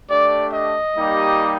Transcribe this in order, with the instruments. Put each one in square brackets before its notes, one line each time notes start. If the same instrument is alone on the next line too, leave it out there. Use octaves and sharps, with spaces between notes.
[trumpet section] A3 D4 G4 D5
D#5
G3 A#3 D#4 G4